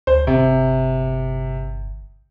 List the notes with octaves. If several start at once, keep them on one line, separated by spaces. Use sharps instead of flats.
D2 C5
G1 C3